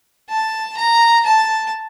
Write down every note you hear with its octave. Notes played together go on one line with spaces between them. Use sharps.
A5
A#5
A5